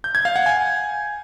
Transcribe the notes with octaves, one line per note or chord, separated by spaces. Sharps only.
G6
G#6
F5
F#5
G#5